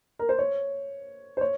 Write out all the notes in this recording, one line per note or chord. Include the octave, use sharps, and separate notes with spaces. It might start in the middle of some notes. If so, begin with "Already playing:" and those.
A#4
C5
C#5
C5
C#5